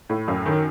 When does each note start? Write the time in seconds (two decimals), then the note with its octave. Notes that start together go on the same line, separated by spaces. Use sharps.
0.09 A2
0.28 F#2
0.46 D#3